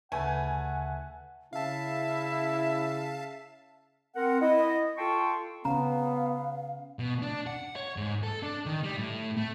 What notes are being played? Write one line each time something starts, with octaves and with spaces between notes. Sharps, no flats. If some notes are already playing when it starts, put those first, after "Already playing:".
D2 C#3 E3 A3 F#5 G#5
C#3 E4 E5 F5 A5
C4 A#4 F#5
E4 D#5
F4 A4 G5 A5 C6 C#6
C#3 B3 C#4 F5 A#5
B2
D4
F#5
C#5
G#2
A4
D4
D#3
G3
A2
A3